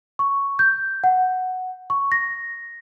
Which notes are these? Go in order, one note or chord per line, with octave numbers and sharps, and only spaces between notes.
C#6
G6
F#5
C#6
A#6